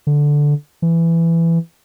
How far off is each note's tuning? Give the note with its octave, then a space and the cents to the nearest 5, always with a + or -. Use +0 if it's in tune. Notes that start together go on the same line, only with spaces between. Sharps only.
D3 -5
E3 +15